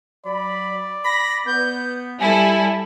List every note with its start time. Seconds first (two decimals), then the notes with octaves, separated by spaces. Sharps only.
0.26 F#3 D5 B5
1.05 B5 A#6
1.47 B3 G6
2.20 G3 E4 A4 E5 G#5